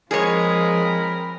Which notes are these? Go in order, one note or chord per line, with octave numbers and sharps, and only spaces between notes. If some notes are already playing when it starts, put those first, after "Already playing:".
F3 G#3 C4 G#4 A#4 C#5 B5